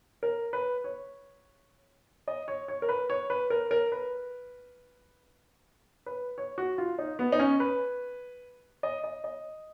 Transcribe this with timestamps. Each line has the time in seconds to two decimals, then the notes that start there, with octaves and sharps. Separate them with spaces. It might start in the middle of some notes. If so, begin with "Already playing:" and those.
0.23 A#4
0.53 B4
0.84 C#5
2.28 D#5
2.48 C#5
2.68 C#5
2.82 A#4
2.89 B4
3.10 C#5
3.30 B4
3.50 A#4
3.71 A#4
3.92 B4
6.06 B4
6.38 C#5
6.58 F#4
6.78 F4
6.99 D#4
7.19 B3
7.32 D#4
7.40 C#4
7.60 B4
8.83 D#5
9.04 D#5
9.24 D#5